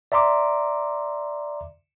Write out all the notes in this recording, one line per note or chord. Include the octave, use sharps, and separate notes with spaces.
D5 E5 A#5 C6 D6